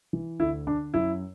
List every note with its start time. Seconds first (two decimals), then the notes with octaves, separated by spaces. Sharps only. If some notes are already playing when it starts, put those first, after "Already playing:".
0.13 E3
0.40 D2 E4
0.67 D3 D4
0.94 F#2 E4